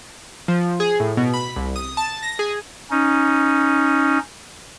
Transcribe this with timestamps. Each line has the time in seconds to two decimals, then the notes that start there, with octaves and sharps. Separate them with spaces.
0.48 F3
0.80 G#4
1.00 A2
1.17 B2
1.34 B5
1.56 C2
1.76 D#6
1.97 A5
2.23 A#6
2.39 G#4
2.91 C#4 D#4